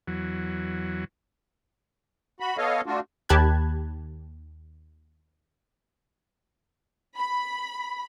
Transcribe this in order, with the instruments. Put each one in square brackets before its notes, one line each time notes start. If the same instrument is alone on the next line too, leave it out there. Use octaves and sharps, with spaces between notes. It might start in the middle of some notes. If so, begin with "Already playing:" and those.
[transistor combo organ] E2 F#3
[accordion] F#4 B5
B3 A4 C#5 D#5 F5
A3 D4 F4 F#4
[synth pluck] D#2 G4 A5 B5 F#6 G#6
[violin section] B5